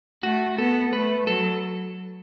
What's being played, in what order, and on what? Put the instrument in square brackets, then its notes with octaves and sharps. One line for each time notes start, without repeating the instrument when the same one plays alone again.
[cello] A3 [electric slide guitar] F#4
[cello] B3 [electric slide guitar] A4
[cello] A3 [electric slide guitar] B4
[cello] F#3 [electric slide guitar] A4